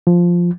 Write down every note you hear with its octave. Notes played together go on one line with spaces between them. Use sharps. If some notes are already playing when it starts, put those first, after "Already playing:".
F3